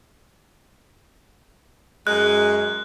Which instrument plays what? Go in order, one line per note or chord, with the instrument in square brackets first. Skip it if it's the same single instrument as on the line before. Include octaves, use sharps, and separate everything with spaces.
[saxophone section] F#2 G#3 [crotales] F#6